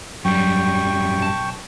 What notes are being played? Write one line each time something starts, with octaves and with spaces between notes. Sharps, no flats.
F#2 F#3 G3 G5 C#6
B1 A5